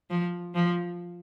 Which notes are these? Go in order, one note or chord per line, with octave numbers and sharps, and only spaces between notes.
F3
F3